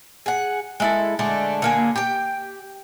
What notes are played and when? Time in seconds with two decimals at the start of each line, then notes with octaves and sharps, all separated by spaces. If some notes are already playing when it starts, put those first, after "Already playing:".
0.26 G#4 F#5
0.80 G#3 E4 A4
1.19 D3 G#3 A3 D4
1.62 D3 A#3 G#4
1.96 G4 G5